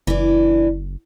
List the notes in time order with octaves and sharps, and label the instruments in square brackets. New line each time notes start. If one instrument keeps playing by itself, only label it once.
[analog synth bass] F#1 [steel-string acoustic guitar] E3 D4